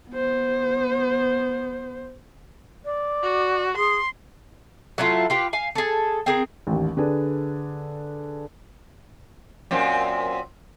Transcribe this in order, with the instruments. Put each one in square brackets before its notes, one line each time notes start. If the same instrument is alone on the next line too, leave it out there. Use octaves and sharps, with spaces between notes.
[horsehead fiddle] B3 C5
[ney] D5
[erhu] F#4
[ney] G#4 [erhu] C6
[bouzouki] F#3 A3 E4 F4
F4 G4 B4
F5 G#5
G#4 A4
C4 G#4 A#4
[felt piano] A1 D#2
D3 D4 G#4 B4
[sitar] F#2 A#2 C4